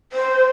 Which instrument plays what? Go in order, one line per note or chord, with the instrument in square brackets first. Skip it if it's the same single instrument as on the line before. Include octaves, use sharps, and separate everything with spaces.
[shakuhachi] C5